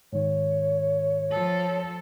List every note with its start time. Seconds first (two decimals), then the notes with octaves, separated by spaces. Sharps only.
0.13 G#2 D#3 C#5
1.31 F3 A4